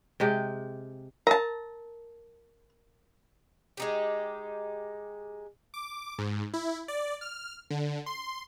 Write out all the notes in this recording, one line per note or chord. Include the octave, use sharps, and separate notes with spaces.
C3 G#3 G4
A#4 A5 A#5
G#3 D#4 G4
D6
G#2
E4
D5
F6
D3
C6